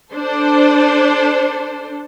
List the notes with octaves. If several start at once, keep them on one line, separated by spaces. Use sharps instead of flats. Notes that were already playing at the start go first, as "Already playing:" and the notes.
D4 A4 C5